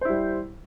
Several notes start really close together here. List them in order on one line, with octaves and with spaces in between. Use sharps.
C5 E4 G3